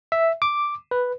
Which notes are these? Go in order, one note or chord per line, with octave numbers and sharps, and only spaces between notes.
E5
D6
B4